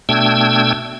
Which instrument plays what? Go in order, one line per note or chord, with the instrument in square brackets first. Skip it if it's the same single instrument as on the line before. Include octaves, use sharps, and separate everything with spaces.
[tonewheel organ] B2 A3 D4 G5 E6 G#6